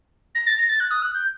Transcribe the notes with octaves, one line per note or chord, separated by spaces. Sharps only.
A#6
A6
A#6
A6
F#6
D#6
F#6
G6